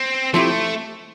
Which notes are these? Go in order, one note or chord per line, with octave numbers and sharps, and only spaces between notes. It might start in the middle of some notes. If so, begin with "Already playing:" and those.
Already playing: C4
F3 A3 C4 E4 G4